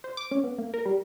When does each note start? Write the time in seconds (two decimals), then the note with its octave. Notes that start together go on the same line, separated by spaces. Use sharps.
0.04 C5
0.17 D6
0.31 C#4
0.44 B3
0.58 A#3
0.74 A#4
0.85 G3